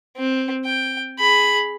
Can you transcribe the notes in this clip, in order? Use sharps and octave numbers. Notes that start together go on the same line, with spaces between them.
C4
G5
G#4 B5